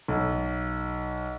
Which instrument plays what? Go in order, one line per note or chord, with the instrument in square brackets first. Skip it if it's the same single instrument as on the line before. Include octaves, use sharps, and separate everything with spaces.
[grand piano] B1